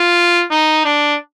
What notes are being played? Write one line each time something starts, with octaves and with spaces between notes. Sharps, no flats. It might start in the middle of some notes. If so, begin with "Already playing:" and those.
Already playing: F4
D#4
D4